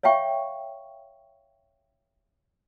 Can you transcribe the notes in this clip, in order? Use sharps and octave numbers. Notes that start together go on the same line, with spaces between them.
C#5 E5 F5 G5 C#6